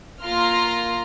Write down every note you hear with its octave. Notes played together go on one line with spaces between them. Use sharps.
A#3 F4 A#5 C6 F6